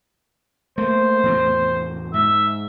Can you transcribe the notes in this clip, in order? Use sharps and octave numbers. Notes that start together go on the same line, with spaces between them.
A3 A#3 C5
E2 A2 C3
G#2 E5